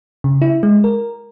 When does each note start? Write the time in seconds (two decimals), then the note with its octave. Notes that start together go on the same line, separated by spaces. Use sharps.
0.24 C#3
0.42 E4
0.63 G#3
0.84 A#4